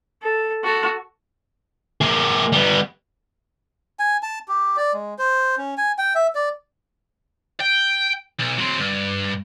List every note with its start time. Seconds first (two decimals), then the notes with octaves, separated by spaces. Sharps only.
0.22 A4
0.64 F#4 A4
2.01 A#3 G#4
2.52 G3 B3
3.99 G#5
4.23 A5
4.48 G4
4.77 D5
4.93 G#3
5.19 C5
5.58 C#4
5.77 G#5
5.98 G5
6.15 E5
6.35 D5
7.60 G5
8.40 B1
8.58 F#3 C4
8.79 G2